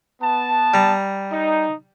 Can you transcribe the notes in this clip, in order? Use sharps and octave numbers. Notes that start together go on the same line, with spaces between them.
B3 A5
G3 A#5
D#4